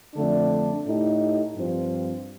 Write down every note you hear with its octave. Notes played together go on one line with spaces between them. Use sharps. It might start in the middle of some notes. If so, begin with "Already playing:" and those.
F2 D3 A3 D4
A2 A3 D#4 G4
G2 F3 C4 F4